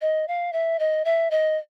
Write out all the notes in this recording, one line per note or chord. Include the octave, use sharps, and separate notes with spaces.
D#5
F5
E5
D#5
E5
D#5